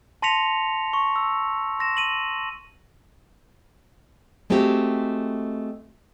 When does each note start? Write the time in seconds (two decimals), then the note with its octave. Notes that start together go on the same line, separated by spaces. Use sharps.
0.22 A5 C6 A#6 B6 C#7 F7
0.93 C#6
1.16 E6
1.79 C6 A#6 E7
1.97 D#7 F#7
4.50 G#3 A3 C4 F#4 G4